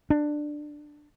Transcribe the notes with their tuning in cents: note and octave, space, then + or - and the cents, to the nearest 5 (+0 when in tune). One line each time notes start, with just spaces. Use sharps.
D4 +15